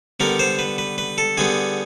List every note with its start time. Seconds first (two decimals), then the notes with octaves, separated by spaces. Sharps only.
0.20 D3 G3 B3 A#4
0.39 C5
0.59 B4
0.78 B4
0.98 B4
1.18 A4
1.37 D3 G3 B3 G#4